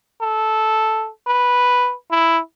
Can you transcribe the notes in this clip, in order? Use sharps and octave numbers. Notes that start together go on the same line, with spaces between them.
A4
B4
E4